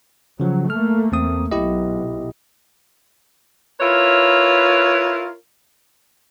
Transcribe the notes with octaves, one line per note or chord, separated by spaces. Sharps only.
C#3 F3 F#3
A3 A#3 F6
E2 C4 D#6
B1 E4 G4 D#5
E4 F4 A#4 B4 C#5